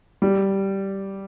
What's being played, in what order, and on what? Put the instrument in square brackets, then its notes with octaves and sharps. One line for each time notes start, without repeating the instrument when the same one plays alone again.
[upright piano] G3